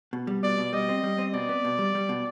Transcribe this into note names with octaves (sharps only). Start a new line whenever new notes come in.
B2
G3
B2 D5
B2
G3 D#5
C4
G3
C4
B2 D5
B3
B2
G3
G3
B2